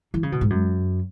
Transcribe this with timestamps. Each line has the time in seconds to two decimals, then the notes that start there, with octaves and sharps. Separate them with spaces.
0.14 E3
0.23 C#3
0.32 B2
0.41 G#2
0.50 F#2